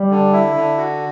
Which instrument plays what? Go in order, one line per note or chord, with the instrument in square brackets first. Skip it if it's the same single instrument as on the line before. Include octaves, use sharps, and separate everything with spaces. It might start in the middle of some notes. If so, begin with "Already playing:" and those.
Already playing: [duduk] G3
[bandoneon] D3
E4
D3
F#4